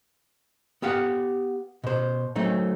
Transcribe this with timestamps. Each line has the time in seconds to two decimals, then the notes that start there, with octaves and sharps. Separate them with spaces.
0.82 B3 G4 F5 F#5
1.84 B2 C5
2.36 F#3 A3 C4 D#4